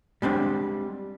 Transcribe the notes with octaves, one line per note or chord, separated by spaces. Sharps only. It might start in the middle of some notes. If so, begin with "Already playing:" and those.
G3 G#3 C4 D4